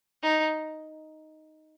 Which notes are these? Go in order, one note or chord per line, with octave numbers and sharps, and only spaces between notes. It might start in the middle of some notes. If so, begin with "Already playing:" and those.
D#4